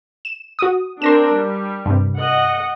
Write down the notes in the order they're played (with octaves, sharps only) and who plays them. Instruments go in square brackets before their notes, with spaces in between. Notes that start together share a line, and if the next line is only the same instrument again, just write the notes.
[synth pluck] E7
F#4 D#6
[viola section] C4 D4 A#4 [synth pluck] C6 A#6 E7
[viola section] G3
[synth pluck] G2 C3
[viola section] D#5 F#5